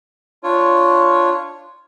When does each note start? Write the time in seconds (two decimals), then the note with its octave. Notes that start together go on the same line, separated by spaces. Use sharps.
0.44 D4 F4 C#5